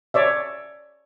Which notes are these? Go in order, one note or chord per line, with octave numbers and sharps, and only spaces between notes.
C#5 D5 E5